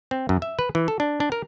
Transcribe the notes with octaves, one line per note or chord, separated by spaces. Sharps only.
C4
F#2
E5
B4
E3
A4
D4
D4
A#4